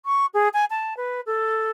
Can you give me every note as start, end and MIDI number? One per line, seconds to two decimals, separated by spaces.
0.06 0.26 85
0.34 0.48 68
0.53 0.65 80
0.70 0.94 81
0.97 1.21 71
1.26 1.71 69